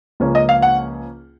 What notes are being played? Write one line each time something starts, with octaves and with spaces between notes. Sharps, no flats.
C#2 C#3 F3 A#3 C#4
D#5
F5
F#5